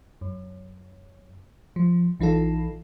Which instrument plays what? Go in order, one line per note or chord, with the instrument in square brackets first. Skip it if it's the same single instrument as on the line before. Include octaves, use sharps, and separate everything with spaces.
[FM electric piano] F#2
F3
A#1 E3 D#4 F4 A4